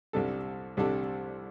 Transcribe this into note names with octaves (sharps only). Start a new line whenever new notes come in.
C2 C3 G3 D4 A4
C2 C3 G3 D4 A4